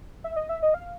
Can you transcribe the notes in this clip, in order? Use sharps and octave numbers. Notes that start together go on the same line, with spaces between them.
E5
D#5
E5
D#5
F5